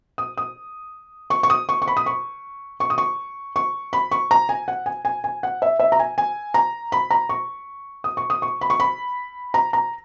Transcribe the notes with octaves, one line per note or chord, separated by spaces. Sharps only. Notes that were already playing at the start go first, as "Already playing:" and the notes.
D#6
D#6
C#6
C#6
D#6
C#6
C#6
B5
D#6
C#6
C#6
D#6
C#6
C#6
B5
C#6
A#5
G#5
F#5
G#5
G#5
G#5
F#5
E5
E5
A#5
G#5
G#5
A#5
B5
A#5
C#6
D#6
C#6
D#6
C#6
B5
C#6
B5
A#5
A#5